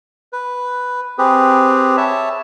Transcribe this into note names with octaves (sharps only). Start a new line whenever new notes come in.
B4
C4 G4 G#4 B4
C#5 E5 A5